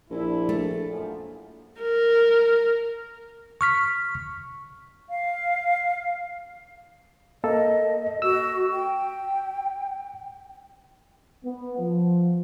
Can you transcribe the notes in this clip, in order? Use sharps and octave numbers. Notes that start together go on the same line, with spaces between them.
A#1 D4 E4
A3
F#2 A#2 F3
A#4
C#6 F6 B6
F5
A#3 A4 A#4 D#5
F#4 E6
G5
B3
F3